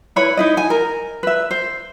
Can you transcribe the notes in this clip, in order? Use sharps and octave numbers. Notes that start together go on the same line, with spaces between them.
E4 B4 C#5 B5
D#4 E4 D#5
G#5
A#4
B4 E5
C5